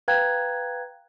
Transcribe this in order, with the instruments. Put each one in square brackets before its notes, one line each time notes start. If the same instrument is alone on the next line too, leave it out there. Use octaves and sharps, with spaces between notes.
[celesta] B4 F5 G5 A#5 F#6 G#6